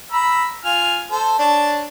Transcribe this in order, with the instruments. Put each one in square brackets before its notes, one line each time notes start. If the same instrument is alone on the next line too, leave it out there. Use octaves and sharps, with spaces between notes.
[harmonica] A#5 B5 E6
F4 G#5 F6
A4 C5
D4 C#5 A5